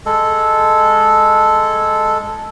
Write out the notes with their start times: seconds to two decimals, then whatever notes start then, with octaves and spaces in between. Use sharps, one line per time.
0.06 G#3 A4